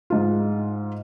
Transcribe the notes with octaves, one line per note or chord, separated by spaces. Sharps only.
G#2 F4